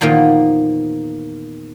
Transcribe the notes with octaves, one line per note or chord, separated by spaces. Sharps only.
E2 A#2 D#3 F3 A#3